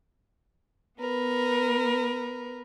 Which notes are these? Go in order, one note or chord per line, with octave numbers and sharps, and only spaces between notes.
B3 A#4 B4